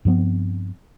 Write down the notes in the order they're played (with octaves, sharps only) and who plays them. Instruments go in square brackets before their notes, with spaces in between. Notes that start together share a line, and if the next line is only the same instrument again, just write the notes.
[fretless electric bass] G2 F3 B3 C4